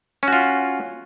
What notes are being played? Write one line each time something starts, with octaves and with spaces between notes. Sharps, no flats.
C#4 F4 F#4